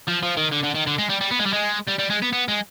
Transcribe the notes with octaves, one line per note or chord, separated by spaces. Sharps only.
F3
F3
D#3
D3
D3
D#3
D3
G#3
G3
G3
B3
G#3
G3
G#3
G3
G3
G#3
B3
B3
G#3